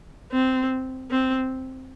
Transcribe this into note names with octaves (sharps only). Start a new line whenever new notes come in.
C4
C4